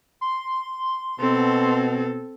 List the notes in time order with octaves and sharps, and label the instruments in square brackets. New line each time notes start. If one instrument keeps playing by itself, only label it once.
[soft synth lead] C6
[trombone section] B2 [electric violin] C4 A4